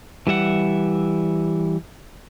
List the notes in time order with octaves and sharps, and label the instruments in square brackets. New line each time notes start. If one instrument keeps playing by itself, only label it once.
[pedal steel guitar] E3 G3 E5 F#5